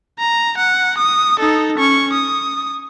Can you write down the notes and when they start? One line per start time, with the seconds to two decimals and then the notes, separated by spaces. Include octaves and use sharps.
0.19 A#5
0.58 F#5
0.98 D#6
1.39 D#4 A4
1.78 C#4 C#6
2.13 D#6